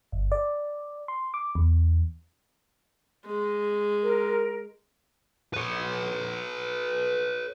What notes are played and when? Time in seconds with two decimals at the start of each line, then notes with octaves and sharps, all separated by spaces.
0.12 G1
0.32 D5
1.08 C6
1.34 D6
1.55 E2
3.26 G#3
4.03 A#4
5.54 B4 C#5